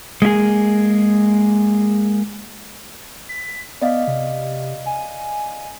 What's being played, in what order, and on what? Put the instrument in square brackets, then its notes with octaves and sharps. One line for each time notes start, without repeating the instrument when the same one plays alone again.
[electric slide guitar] G#3 A#3 E4 G#4
[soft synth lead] B6
[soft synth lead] B3 [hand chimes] D5 D#5 F5
[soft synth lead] C3
G#5